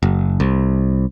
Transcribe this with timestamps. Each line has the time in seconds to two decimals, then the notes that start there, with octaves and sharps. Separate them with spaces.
0.03 F#1
0.40 C2